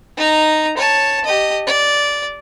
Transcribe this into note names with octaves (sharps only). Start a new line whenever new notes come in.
D#4 A#5
C#5 A5
G4 D#5
D5